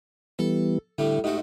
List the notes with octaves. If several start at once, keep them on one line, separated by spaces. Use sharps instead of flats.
E3 G3 B3 A4
A2 D3 G3 A3
G#2 A3 F#4 G4 D#5